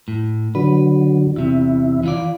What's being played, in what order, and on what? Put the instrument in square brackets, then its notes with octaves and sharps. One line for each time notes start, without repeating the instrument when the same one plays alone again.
[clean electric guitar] A2
[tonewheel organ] D3 F#3 [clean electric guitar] B4
[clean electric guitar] E2 C3 [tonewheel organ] E4
[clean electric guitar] E3 F4 D5